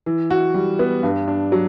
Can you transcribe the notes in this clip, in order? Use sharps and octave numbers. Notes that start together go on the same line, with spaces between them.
E3
F#4
G3
B3
G2
D4
F#3